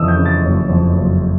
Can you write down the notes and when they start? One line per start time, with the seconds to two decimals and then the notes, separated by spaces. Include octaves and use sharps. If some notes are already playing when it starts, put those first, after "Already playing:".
Already playing: F2 C#3 E3 D#6 E6
0.08 G6
0.17 C#3
0.25 A6
0.42 F#1
0.69 F2
0.95 F#1